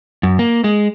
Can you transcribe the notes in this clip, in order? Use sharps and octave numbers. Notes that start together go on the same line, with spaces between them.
F#2
A#3
G#3